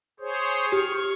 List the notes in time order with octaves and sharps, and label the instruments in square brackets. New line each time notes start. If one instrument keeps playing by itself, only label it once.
[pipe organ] G#4 C5 C#5
[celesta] G4 [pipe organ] C#6 F6